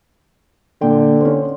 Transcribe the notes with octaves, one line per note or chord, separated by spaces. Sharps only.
A#2 D3 G5
C#4 C5